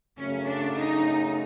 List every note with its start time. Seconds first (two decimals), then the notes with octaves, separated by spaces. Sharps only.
0.17 F#2 C#3 F#3 A3 C#4
0.47 D4
0.76 D#4